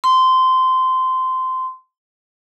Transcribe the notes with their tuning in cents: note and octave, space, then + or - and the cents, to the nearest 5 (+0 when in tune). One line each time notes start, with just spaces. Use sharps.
C6 -15